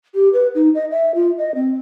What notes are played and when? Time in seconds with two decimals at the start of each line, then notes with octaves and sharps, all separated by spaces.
0.14 G4
0.33 B4
0.54 D#4
0.74 D#5
0.90 E5
1.14 F4
1.37 D#5
1.54 C4